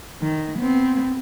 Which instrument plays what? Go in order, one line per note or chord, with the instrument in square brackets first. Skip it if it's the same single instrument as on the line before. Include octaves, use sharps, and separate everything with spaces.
[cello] D#3
B3 C4